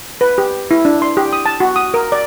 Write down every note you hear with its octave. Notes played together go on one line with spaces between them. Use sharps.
B4
G4
E4
D4
C6
G4
D#6
A5
F#4
D#6
A#4
D5